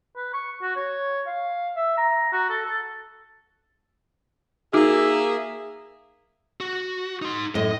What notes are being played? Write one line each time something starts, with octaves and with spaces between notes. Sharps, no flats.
B4
C#6
F#4
C#5
F5
E5
A#5
F#4
A4
A4
A#3 D#4 F#4 G#4 E5
F#4
D#4 C6
F#2 A2 D#5